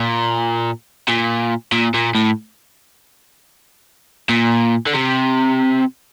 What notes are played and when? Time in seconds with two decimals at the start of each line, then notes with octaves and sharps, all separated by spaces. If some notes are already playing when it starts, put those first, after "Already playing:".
Already playing: A#2
1.08 A#2
1.72 A#2
1.94 A#2
2.15 A2
4.29 A#2
4.86 D3
4.94 C3